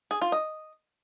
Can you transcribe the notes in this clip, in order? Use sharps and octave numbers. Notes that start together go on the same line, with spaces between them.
G#4
F4
D#5